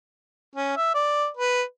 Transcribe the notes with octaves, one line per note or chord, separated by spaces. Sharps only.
C#4
E5
D5
B4